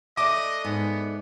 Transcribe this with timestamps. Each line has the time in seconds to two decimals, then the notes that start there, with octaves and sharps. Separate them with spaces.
0.17 A3 D4 D#5 D6
0.64 G#2 B3